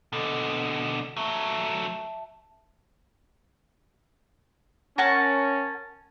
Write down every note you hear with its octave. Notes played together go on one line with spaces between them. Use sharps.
B2 D3 A4 D#5
F#3 A3 E5 A5
C#4 A#4 F#5 A5